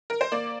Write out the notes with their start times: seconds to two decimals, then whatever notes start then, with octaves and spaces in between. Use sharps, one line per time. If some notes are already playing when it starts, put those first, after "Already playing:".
0.10 A#4
0.21 C5
0.32 A#3 D5